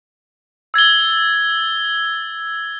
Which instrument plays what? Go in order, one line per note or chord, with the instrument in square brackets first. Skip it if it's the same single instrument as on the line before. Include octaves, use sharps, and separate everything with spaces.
[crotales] E6 G#6 A6 G7